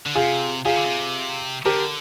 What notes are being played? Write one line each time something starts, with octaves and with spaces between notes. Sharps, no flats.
D3
C3 F4 G#4
C3 F4 G#4
D3
C3
D3 G4 A#4